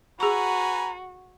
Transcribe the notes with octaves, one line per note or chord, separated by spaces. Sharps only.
F#4 G#4 B4 G#5 A#5 C#6